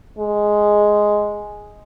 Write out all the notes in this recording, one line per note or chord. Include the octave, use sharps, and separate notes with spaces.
G#3